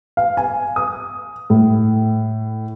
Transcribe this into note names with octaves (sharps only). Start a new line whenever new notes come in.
F5
G#5
D#6
A2